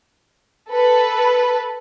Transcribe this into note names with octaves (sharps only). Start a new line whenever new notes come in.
A4 B4